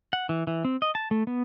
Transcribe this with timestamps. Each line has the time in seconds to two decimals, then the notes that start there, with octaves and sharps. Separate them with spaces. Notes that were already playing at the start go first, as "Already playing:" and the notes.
0.13 F#5
0.29 E3
0.47 E3
0.65 C4
0.82 D#5
0.95 A5
1.11 A3
1.27 B3